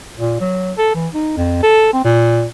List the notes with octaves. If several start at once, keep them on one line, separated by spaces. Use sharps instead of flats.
A#2
F#3
A4
E3
D#4
F2
A4
C4
A#2